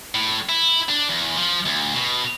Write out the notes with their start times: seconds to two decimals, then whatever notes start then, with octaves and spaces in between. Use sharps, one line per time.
0.15 A2
0.49 E4
0.89 D4
1.09 E2
1.37 F3
1.66 D2
1.94 B2